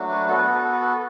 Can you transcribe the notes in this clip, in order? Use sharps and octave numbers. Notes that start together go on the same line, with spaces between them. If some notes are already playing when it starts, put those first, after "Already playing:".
Already playing: F#3 A3 D4 F#4
B4
B3 F#4 A4
B4
A4
B4
A4
B4
A4